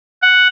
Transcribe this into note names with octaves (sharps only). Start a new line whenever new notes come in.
F#5